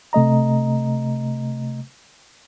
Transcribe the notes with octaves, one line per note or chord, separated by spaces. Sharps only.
C3 A3 D#5 A#5